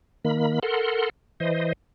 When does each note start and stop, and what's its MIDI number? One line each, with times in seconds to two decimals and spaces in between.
0.25 0.59 51
0.25 0.59 58
0.25 0.59 83
0.63 1.09 69
0.63 1.09 70
0.63 1.09 78
0.63 1.09 84
1.40 1.73 52
1.40 1.73 72
1.40 1.73 75